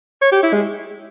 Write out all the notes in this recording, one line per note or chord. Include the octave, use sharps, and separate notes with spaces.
C#5
G4
E4
G#3